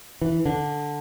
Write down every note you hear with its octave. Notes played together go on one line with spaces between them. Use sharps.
E3
D3